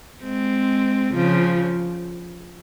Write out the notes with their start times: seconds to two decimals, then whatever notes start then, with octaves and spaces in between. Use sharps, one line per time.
0.24 G#3 C4
1.13 C#3 F3